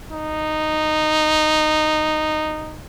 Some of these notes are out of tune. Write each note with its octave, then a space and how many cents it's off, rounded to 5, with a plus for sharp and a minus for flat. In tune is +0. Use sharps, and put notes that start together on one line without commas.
D#4 -10